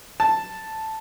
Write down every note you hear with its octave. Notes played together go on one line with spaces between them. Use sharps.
A5